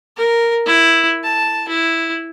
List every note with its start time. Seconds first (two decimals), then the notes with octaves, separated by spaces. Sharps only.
0.17 A#4
0.66 E4
1.24 A5
1.68 E4